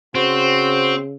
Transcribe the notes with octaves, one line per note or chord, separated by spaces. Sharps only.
C#3 C4 F#4 C5